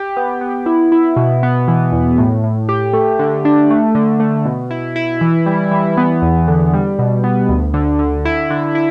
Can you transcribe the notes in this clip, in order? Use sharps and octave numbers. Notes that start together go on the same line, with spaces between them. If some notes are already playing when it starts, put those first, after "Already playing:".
Already playing: G4
B3
B3
E4
E4
B2
B3
E3
E2
A2
A2
G4
A3
D3
D4
A3
D3
A3
B2
E4
E4
E3
G3
E3
B3
E2
D3
G3
B2
B3
D2
D3
D3
E4
D3
E4